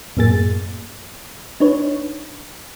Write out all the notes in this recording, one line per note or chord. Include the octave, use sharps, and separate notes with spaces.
F#2 A2 A#3 G#4 A6
D4 D#4 B4 C#5